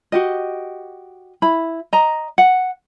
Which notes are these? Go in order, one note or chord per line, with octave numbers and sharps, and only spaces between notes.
F#4 G4 D#5
E4 B5
D#5 A#5
F#5